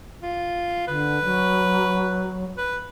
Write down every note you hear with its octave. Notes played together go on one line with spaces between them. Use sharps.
F4
D3 B4
F#3
B4